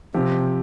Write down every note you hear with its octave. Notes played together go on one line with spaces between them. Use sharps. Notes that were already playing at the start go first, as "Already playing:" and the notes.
C3 F3 C4 G4